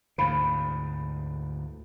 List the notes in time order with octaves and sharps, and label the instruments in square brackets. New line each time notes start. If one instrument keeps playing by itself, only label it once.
[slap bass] D2 G#2 D3 [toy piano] C5 F5 B5